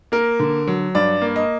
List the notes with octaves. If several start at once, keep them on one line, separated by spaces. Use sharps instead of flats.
A#3 A#4
D3
F#3
G2 D5
A#3
D#5